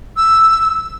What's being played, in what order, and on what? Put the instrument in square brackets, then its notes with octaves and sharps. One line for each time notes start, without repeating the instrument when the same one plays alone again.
[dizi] E6